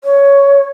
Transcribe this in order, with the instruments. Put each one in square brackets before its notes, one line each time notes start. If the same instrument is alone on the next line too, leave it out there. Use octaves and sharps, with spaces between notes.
[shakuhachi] C#5